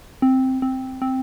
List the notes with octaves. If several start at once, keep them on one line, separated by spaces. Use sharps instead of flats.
C4
C4
C4